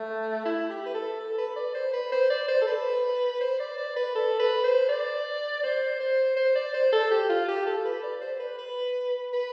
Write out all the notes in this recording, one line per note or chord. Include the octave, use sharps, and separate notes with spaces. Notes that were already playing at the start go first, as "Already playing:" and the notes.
Already playing: A3
E4
G4
B4
A4
A4
B4
D5
C5
B4
C5
D5
C5
A4
B4
C5
D5
D5
B4
A4
B4
C5
D5
C5
C5
C5
D5
C5
A4
G4
F4
G4
A4
B4
D5
C5
B4
B4
B4